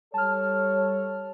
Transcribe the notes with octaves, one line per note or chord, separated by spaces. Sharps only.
G3 A4 C#5 A5 F6